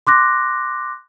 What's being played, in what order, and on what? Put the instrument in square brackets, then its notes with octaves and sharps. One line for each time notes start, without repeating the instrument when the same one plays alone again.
[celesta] C6 D6 F#6 A#6